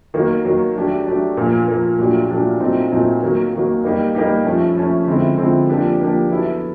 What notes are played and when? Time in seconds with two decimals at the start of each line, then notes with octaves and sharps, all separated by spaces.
0.14 D#3 F#3 A#3
0.45 D#3 F#3 A#3
0.76 F#3 A3 D4 G4
1.06 F#3 A3 D4 G4
1.37 A#2 F3 A#3
1.67 A#2 F3 A#3
1.99 A#2 F#3 A3 D4 G4
2.30 A#2 F#3 A3 D4 G4
2.60 A#2 F#3 A3 C4 D#4
2.91 A#2 F#3 A3 C4 D#4
3.23 D#3 F#3 A#3
3.53 D#3 F#3 A#3
3.84 G3 A#3 D#4 G4
4.15 G3 A#3 D#4 G4
4.45 F3 A3 C#4
4.76 F3 A3 C#4
5.07 D3 F3 G#3 C4 E4
5.38 D3 F3 G#3 C4 E4
5.69 F3 A#3 D4 G4
5.99 F3 A#3 D4 G4
6.31 F#3 B3 E4 A4